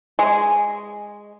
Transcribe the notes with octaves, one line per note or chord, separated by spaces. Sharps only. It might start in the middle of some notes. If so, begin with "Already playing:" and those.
G#3